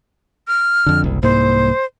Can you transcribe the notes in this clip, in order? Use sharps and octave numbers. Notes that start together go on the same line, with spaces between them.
F6
F2 D3
F#1 C2
C2 G#2 A#3 C5